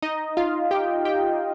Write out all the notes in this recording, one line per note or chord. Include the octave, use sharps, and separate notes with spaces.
D#4 D#5
F4 F5
G4 G5
G4 G5